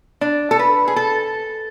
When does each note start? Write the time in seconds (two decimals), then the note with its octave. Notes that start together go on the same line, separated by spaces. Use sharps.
0.21 D4
0.51 A4
0.59 B4
0.88 G#4
0.96 A4